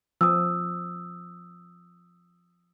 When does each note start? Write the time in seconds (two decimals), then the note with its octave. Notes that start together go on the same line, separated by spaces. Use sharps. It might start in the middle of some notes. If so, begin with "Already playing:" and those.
0.21 F3 D#6 E6